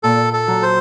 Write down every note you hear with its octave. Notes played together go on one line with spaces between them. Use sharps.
A#2 A4
A4
F#3
C5